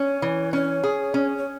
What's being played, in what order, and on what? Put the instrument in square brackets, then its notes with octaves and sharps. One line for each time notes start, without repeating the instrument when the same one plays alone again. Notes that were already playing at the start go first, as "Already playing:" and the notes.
Already playing: [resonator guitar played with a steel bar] C#4 [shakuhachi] C#5
[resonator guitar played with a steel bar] E3
[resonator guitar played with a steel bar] C#4 [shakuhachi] C#5
[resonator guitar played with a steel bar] G#4
C#4
[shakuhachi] C#5